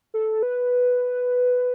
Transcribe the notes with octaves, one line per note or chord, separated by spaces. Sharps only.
A4
B4